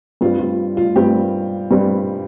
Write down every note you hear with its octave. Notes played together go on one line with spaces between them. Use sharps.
G2 G3 C4 F4
F4
F4
G2 G3 C4 G4
G2 G3 C4